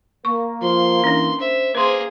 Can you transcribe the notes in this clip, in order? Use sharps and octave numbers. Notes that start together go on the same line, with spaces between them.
A#3 C#6
F3 C6
E3 C#4 D4
C5 E5
A#3 G#4 B4 C5 C6